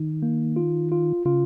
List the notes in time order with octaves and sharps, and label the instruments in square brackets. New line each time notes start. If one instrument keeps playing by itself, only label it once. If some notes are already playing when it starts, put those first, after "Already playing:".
Already playing: [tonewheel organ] D#3
[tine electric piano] A#3
F4
F4
[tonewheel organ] C#3 [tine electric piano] F4